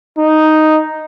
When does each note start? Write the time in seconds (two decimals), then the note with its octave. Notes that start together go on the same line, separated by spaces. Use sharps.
0.18 D#4